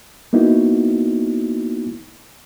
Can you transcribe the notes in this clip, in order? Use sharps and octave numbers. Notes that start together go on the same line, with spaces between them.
A#3 B3 D#4 E4 F#4